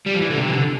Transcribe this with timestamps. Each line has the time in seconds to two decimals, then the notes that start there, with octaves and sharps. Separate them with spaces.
0.06 G3
0.14 F3
0.21 E3
0.30 D3
0.38 C3
0.48 E3
0.52 D3